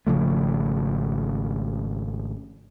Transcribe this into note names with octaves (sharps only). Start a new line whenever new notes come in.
G#1 C#3 F3 A3